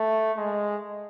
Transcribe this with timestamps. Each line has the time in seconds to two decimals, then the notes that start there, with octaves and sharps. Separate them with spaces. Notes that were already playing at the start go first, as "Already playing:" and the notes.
Already playing: A3
0.37 G#3